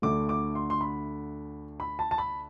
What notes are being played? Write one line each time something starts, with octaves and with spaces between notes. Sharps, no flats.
D2 D3 A3 D6
D6
C6
C6
B5
B5
A5
A5
B5